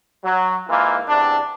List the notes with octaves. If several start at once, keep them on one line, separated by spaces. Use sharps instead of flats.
F#3
G#2 E3 A#3 F4
E2 C3 D4